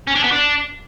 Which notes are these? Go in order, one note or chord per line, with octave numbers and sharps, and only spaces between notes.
C#4
D4
B3
D4